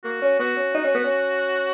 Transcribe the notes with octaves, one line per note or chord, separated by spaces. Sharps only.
A#3 F#4
C#4
B3 F#4
C#4
D#4
C#4
B3
C#4